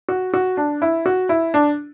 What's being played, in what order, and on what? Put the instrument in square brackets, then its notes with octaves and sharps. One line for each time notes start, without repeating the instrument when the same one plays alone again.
[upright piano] F#4
F#4
D4
E4
F#4
E4
D4